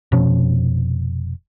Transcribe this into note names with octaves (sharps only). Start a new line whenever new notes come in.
F1 B2 F3 C#4